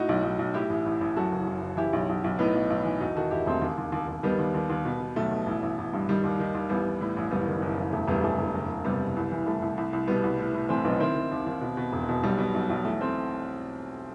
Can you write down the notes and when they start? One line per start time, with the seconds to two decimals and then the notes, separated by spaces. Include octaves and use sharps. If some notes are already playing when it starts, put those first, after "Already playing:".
Already playing: A2 D#4 F#4
0.09 B1
0.23 B1
0.39 B1
0.54 A2 E4 G4
0.69 A1
0.86 A1
1.01 A1
1.17 F#2 F#4 A4
1.32 F#1
1.47 F#2
1.62 F#1
1.77 E3 E4 G4
1.93 B1
2.09 B1
2.24 B1
2.39 A2 B3 D#4
2.55 B1
2.70 B1
2.85 E3
3.00 E1 D#4 F#4
3.15 D#3 F#4 A4
3.31 E1 E4 G4
3.46 E1 A3 C4
3.62 D#2
3.78 D#2
3.92 D#2
4.08 D#2
4.23 D#3 G3 B3
4.39 D#2
4.54 D#2
4.70 D#2
4.85 B2
5.00 B2
5.16 B1 A3
5.31 B2
5.46 A1
5.62 A1
5.78 A1
5.93 G2
6.09 D#3 G3
6.24 D#2
6.39 D#3
6.55 D#2
6.69 A1 G3 B3
6.86 A1
7.01 A2
7.16 A1
7.31 F#1 G3 B3
7.47 D#3
7.62 F#1
7.77 F#1
7.92 E1 A3
8.08 E1 G3 B3
8.24 E1 A3
8.39 E1
8.55 F#1
8.70 F#1
8.85 C3 G3 B3
9.01 F#1
9.16 C2
9.32 E3
9.46 C2 A3
9.62 C2
9.77 C2
9.93 C2
10.07 B2 G3 B3
10.24 C2
10.39 A2
10.54 A2
10.69 E3 A3 C4
10.84 B1 B3 D#4
11.00 D#3 C4 E4
11.15 D#3
11.31 D#2
11.46 D#2
11.61 B2
11.77 B2
11.93 E1
12.09 B2
12.23 B1 G3
12.38 B2
12.54 B1
12.70 B1
12.85 E2 A3
13.01 A3 C4